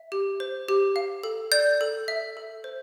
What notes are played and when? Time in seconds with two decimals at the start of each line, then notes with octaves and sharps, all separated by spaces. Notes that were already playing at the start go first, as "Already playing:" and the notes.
Already playing: E5
0.12 G4
0.40 C5
0.68 G4
0.96 F5
1.24 A4
1.52 D5 G6
1.81 A4
2.08 E5
2.37 A4
2.64 C5